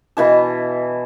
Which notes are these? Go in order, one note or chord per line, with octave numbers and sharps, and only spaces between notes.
B2 E3 A5